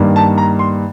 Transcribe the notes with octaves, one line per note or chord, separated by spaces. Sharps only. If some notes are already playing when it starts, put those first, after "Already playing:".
Already playing: G2 D#3 G3 A#3
A5
A#5
C6